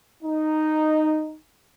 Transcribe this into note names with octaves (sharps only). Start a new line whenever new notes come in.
D#4